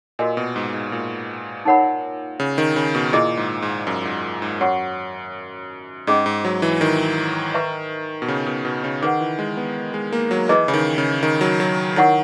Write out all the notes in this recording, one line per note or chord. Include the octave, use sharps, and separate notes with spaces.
A#2 F#4 A#4 D#5 G#5
B2
G#2
G#2
A#2
D#4 A#4 C#5 F#5 B5
C#3
D#3
C#3
B2
A#2 E4 G#4 D#5
G#2
G#2
F#2
G#2
G#2
F#2 F#4 C#5 F#5 C#6
G#2 C#4 G#4 D#5
G#2
F#3
E3
D#3
B4 E5 A#5 C#6
B2
C#3
B2
B2
C#3
D#3 G#4 B4 F#5
E3
G#3
B3
G#3
A#3
F#3
E3 E4 G#4 B4 D#5
C#3
D#3
C#3
D#3
F#3
F#3
D#3 E4 A#4 C#5 F#5 C#6